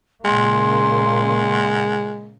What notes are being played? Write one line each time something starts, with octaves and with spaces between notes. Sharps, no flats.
A#2 C#3 G#3 A#3 C6